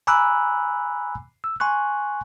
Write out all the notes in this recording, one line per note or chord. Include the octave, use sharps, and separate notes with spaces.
G#5 A#5 B5 D6 E6 F#6
E6
G#5 C6 C#6 F#6